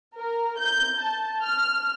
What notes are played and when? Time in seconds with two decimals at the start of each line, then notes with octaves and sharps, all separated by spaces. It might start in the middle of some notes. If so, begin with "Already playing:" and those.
0.16 A#4
0.58 G6
0.98 A5
1.43 F6